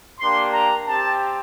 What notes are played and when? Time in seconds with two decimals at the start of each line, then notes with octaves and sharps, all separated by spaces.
0.20 A#3 D4 G4 C6
0.54 A#5
0.86 C4 G4 A5